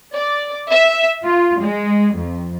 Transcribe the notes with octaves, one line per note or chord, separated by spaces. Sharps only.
D5
E5
F4
G#3
F2